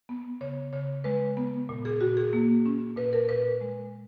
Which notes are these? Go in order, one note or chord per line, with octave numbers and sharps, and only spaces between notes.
B3
C#3 C#5
C#3 C#5
G#3 B4
B3
A#2
G#4
A#2 F#4
G#4
A#3
C#4
A#2 B4
A#4
A#2 B4
G#3